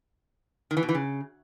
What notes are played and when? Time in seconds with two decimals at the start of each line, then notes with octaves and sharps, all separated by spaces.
0.71 D#3
0.77 E3
0.83 B2
0.89 E3
0.95 C#3